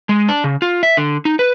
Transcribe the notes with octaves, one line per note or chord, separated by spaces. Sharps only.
G#3
D4
C#3
F4
E5
D3
D#4
B4